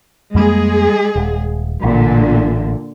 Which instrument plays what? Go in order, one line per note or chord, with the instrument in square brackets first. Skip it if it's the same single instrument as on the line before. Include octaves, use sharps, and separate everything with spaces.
[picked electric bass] F2 G3 A#3 [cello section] G#3 G#4
[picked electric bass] D#1
[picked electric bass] A1 [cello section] A#2 D3